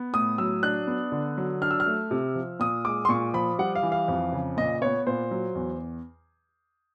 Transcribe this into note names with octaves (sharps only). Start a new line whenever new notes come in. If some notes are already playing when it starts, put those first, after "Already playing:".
Already playing: B3
A2 D#6
F#3 E6
D4 F#6
B3
D3
F#3
D4 F6
E6
F6
A3
C3
F3
A#2 D#6
G#3 D6
C6
A#2 C#6
F3 B5
G3 F#5
F5
E3
F5
F2
C#3
A#2 D#5
B3 C#5
A#2 C5
F#3
E2